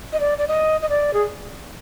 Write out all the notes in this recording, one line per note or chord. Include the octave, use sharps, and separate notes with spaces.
D#5
D5
D5
D#5
D#5
D5
G#4